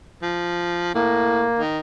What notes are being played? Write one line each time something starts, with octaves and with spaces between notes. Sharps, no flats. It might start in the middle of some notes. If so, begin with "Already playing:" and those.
F3
A2 A#3
D#3